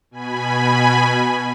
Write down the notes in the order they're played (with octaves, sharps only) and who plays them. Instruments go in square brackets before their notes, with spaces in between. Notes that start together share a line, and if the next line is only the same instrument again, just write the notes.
[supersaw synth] B2 G#5 B5